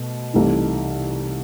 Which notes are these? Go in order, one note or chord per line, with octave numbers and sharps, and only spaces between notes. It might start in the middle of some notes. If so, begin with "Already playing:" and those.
Already playing: B2 A3
C2 C3 E3 A3 D#4